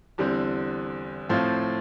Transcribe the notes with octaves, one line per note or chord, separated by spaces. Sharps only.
E2 D3 G3 C4
A2 F3 C4 F4 C5